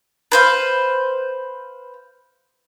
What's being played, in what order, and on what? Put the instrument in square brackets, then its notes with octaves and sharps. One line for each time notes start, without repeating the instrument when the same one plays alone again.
[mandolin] B4 C5 F5